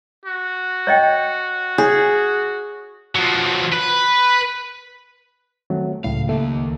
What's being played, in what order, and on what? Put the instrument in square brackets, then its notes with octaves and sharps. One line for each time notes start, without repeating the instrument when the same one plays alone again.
[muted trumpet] F#4
[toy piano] C#5 D#5 G5
[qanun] G#4 [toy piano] C#5
[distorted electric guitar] F3 F#3
B4
[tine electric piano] D#3 A3 C4 [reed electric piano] F#3
[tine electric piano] C#2 C#3 F#3 [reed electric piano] A2 [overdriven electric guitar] F5
[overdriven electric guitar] D#2 A#3 [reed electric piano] A3